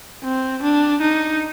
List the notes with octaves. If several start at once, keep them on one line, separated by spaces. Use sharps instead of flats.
C4
D4
D#4